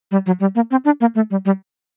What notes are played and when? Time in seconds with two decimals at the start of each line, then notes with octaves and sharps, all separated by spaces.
0.11 G3
0.26 F#3
0.40 G3
0.55 A#3
0.71 C4
0.85 D4
1.01 A#3
1.15 A3
1.31 G3
1.45 G3